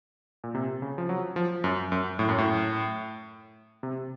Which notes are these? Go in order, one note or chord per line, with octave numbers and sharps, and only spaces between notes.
A#2
C3
C#3
F3
F#3
F3
F#2
F#2
A2
F#2
A2
C3